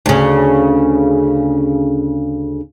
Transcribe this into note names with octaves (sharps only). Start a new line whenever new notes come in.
D2 C#3